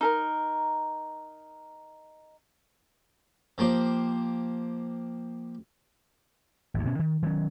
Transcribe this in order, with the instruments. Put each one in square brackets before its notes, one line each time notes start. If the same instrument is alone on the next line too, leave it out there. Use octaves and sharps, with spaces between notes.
[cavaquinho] D#4 A4 A#4
[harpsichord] F3 A#3 G4 C5
[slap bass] G#1 D2
B2 C#4
D#3
D#3 F#3 C#4